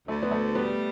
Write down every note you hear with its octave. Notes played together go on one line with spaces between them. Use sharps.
D2 A3
B3
A3
G3 B3